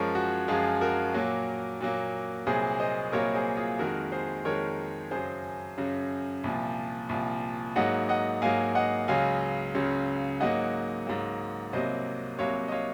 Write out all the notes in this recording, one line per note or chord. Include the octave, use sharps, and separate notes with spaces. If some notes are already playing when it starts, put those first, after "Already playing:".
Already playing: F#2 F3 G#3 A#4 C#5
F#4
F#2 F3 G#3 F4 G#4
F#4 A#4
A#2 F#3 A#3
A#2 F#3 A#3
C2 A#2 F#3 A#3 G#4 C5
C5 D#5
C2 A#2 F#3 A#3 A#4 C#5
G#4 C5
F4 G#4
F2 D#3 G#3 F#4 A#4
G#4 C5
F2 D#3 G#3 A#4 C#5
F#2 C#3 F#3 G#4 C5
F#2 C#3 F#3
C2 A#2 F3
C2 A#2 F3
G#2 F#3 A#3 D#5 F#5
D#5 F#5
G#2 F#3 A#3 F5 G#5
D#5 F#5
C#2 C#3 F#3 F5 G#5
C#2 C#3 F#3
G#2 F#3 A#3 D#5 F#5
G#2 F#3 A#3
C2 C3 F#3 A#3 C5 D#5
C2 C3 F#3 A#3 C#5 F5
D#5
C#5 F5